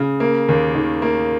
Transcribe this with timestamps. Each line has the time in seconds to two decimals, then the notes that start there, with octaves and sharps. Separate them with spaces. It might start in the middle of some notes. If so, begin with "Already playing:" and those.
Already playing: C#3
0.20 A#3
0.49 D#2
0.75 D#3
1.02 A#3